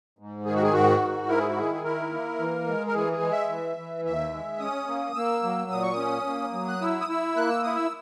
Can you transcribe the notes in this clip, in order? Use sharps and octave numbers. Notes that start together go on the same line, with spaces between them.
G#2
D#3 G#4
F#4
G#4
G#2 F#4
G#2
E4 A#4
G#4
F#4
D#3 G#4
G#4
E4 A#4
A#3
E3
G#3
A#4
E3 G#4
G#4
G#3
E5
E3
E3
D#2 E5
G#3
C#4 D#6
A#3
A#3 E6
F#3
A#2 D#6
C#6
C#4 D#6
A#3
F#3
F#6
E4 E6
D#6
E4 E6
A#3 F#6
E6
E4 D#6
E6